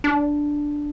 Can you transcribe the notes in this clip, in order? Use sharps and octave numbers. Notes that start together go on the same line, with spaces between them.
D4